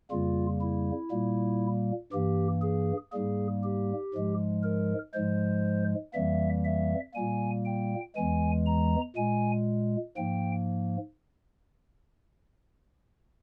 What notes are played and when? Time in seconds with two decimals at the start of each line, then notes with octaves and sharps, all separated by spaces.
0.11 F2 C#3 G3 A#3 F4
0.62 E4
1.11 A#2 G3 A#3
2.12 G2 E3 A#3 G4
2.62 G#4
3.12 G#2 G3 A#3 G#4
3.63 G4
4.14 G#2 F3 G#3
4.63 A#4
5.14 G#2 F3 G#3 C5
6.14 F2 E3 G3 A#3 E5
6.65 E5
7.14 A#2 G3 A#3 G#5
7.65 G5
8.16 E2 E3 G#3 G#5
8.66 A#5
9.16 A#2 G#3 G#5
10.16 G#2 F3 A#3 G5